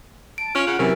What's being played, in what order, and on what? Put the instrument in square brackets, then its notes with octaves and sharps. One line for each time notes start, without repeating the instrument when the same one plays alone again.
[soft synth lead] A5 [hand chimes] D7
[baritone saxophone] C#4 [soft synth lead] F4 [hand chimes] F6 D7
[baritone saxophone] C#3 [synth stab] F#5
[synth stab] C3 C#4 [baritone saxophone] E3 [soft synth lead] F#3 [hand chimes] G4 A#4